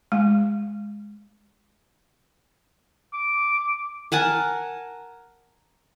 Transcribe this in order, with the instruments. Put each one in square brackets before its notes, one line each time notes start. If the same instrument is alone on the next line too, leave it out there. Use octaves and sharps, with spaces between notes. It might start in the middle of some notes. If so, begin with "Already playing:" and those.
[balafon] G#3
[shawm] D6
[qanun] A#4 F#5 G#5 A5